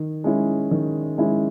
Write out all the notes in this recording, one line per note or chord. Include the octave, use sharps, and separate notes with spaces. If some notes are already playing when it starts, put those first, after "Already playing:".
Already playing: D#3
G#3 C#4 E4
D#3
G#3 C#4 E4